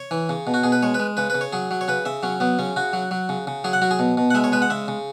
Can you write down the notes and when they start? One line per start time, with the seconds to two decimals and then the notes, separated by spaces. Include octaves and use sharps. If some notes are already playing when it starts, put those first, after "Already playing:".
Already playing: C#5
0.11 E3
0.29 C#3
0.47 B2
0.54 F#4
0.63 B2 G#4
0.72 B4
0.83 G#3 C#5
0.94 G#3 B4
1.17 C#3 B4
1.30 C#3 B4
1.41 C#5
1.53 F#3 G#4
1.71 F#3
1.81 C#5
1.88 C#3 B4
2.05 C#3 E5
2.23 F#3 C#4
2.40 F#3 B3
2.59 C#3 C#4
2.76 C#3 F#4
2.93 F#3
3.11 F#3
3.29 C#3
3.47 C#3
3.64 F#3 G#4
3.73 F#5
3.82 F#3 F#4
3.91 G#4
3.99 B2
4.17 B2
4.30 F#5
4.34 G#3 E5
4.44 C#5
4.52 G#3 B4
4.62 F#5
4.70 C#3 E5
4.88 C#3